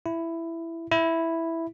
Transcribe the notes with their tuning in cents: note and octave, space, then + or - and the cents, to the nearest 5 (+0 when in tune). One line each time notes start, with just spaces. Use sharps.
E4 +10
E4 +0